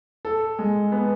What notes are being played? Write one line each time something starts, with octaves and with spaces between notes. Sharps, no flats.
A4
G#3
B3